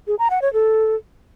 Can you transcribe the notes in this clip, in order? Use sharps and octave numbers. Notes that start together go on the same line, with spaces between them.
G#4
A#5
F#5
C#5
A4